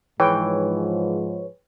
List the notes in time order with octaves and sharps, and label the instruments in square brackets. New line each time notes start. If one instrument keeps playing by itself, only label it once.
[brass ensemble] G#2 F3 [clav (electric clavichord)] E3 [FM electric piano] G#4 B4 C#5 [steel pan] G5